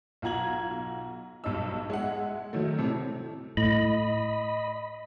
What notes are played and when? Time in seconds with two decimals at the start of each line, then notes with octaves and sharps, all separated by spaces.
0.22 B1 F4 F#5 A#5 G#6 F#7
1.44 B1 G2 D#4 E6
1.90 G#3 E5 F#5
2.53 D#3 F#3 A3
2.78 A2 C3 A4
3.57 A2 D#5 B5